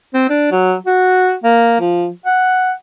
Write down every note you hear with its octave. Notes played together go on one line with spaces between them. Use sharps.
C4
D4
F#3
F#4
A#3
F3
F#5